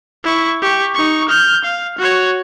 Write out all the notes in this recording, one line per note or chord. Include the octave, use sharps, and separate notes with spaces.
E4 C#6
G4 C#6
D#4 C#6
F6 G6
F5
F#4 C#5